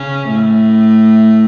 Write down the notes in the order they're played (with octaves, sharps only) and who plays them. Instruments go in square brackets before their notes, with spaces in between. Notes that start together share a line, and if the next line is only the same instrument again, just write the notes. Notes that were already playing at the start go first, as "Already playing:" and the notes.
Already playing: [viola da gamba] C#3 C#4
A2 A3